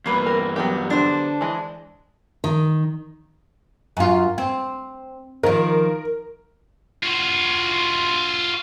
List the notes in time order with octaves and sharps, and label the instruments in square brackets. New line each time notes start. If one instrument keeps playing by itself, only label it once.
[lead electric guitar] E2 G2 [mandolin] A#3 B4
[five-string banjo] A#4
F#3 B3 G4
[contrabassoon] D3 [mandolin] D4 C5
[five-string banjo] E3 G#3
[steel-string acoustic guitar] D#3
[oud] F#2 F4
C4
[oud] D#3 F3 [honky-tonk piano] A#4
[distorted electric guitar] F4 F#4